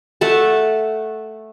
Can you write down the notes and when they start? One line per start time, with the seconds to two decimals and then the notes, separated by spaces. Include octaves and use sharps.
0.21 A3 E5 F#5 A5